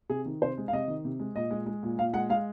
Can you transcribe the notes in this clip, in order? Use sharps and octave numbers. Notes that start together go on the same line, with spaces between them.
C3 G#4
D#3
C3 C5
G#3
F5
C3 D#5
D#3
C3
G#3
A#2 D#5
G#3
G#3
A#2
A#2 F5
G#3 F#5
G#3 F5